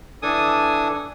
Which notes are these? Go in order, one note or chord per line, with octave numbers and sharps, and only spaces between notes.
E3 D4 A4 G#5 D#6